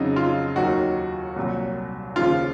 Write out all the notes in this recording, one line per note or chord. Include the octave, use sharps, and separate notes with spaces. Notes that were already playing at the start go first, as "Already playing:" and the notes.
Already playing: F2 C#3 F#3 D#4
F4
D#2 D#3 F#3 F#4
C2 A#2 F#3
D#2 C#3 F3 F4